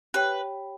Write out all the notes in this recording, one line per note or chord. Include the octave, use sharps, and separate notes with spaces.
G4 B4 C#5 G5 B5